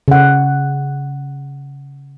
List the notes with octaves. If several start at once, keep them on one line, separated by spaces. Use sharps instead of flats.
C#3 F#5